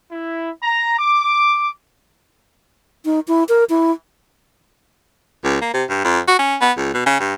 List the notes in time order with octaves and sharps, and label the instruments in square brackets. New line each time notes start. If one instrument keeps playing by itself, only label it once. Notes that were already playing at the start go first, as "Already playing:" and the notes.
[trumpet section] E4
A#5
D6
[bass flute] D#4
E4
A#4
E4
[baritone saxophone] C#2
A#3
C3
G2
F2
F#4
C#4
B3
C#2
B2
C#3
G2